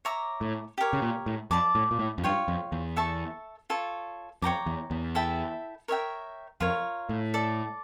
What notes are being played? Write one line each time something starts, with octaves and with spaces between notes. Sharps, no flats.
C#5 E5 A#5 D6
A2
G4 A#4 C#5
C#3
A#2
A2
F2 D5 A5 D6
A2
A#2
A2
F2
G2 F4 C#5 G5 C#6
F2
E2
A4 E5 A5 C#6
F4 A4 C#5
F2 C#5 G5 A#5 D6
E2
E2
E4 A4 E5 G5
A#4 C#5 E5 G5
F2 F4 A#4 C#5
A2
A4 D5 A5 D6